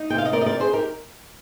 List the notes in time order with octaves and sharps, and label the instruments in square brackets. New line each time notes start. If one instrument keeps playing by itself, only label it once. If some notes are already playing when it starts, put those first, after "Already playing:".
Already playing: [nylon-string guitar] D#4
C3 G5
F5
D#5
C4 A#4 D5
D#5
A#4 D5
G3
G#4 C5
D#4 G4 A#4